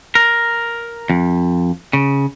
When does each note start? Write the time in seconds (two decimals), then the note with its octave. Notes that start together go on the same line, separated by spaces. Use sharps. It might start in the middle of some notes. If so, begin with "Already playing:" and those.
0.15 A#4
1.10 F2
1.93 C#3